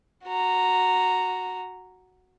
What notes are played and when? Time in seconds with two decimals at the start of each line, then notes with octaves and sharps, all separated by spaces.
0.25 F#4 A#5